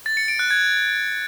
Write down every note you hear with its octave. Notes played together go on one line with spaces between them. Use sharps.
A6
C#7
D7
F#6
G#6